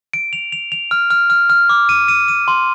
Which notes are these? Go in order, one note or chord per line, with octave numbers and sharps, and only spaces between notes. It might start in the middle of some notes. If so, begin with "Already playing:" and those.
D7
F7
F7
F7
F6
F6
F6
F6
D6
D#7
D#7
D#7
C6